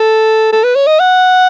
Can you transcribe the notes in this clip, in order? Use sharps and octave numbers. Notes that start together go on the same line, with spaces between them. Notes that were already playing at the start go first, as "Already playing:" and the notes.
Already playing: A4
A4
B4
C#5
D#5
F#5